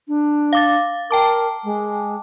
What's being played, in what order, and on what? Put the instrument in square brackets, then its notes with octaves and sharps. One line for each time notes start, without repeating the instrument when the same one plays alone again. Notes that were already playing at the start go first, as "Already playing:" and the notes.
[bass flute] D4
[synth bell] F5 D6 A6
[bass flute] A#4 [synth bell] G5 A5 D6
[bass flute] G#3